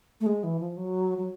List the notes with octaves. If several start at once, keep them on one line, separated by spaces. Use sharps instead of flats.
A3
G#3
E3
F3
F#3
F#3